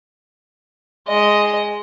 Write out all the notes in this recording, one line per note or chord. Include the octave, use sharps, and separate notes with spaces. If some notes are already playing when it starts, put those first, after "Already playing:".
G#3 D#5